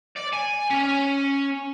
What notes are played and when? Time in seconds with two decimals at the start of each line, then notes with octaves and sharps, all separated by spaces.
0.16 D5
0.33 G#5
0.70 C#4